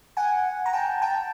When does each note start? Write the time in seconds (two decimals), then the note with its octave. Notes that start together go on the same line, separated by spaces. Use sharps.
0.17 F#5 G#5
0.66 A#5
0.73 G5 A5
1.02 G5 A5